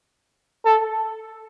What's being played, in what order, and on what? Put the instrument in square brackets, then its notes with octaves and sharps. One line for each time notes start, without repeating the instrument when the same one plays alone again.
[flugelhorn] A4